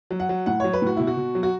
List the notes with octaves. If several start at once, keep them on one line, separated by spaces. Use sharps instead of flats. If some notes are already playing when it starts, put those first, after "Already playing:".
F#3
F#5
F#3
A2 F#5
F#3 C#5
B4
A2 F#4
B2 E4
F#4
B2
F#3
F#4